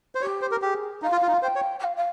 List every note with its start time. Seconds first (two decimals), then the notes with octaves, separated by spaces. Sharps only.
0.15 C5
0.21 G4 C#5
0.41 C5
0.51 A#4
0.62 G4 G#4
1.02 D#4 F5
1.12 F4
1.22 F4
1.28 D#4
1.32 F4
1.42 C5 G5
1.56 C#5
1.79 G5
1.83 F5
1.96 F5